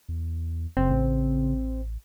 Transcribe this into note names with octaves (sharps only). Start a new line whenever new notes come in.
E2
F#1 C#3 C4
A1